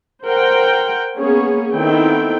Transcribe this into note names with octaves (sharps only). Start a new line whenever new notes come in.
A#4 C5 F#5 G5
A#3 B3 C#4 G#4 C#5
D#3 B3 C4 E4 A4 G5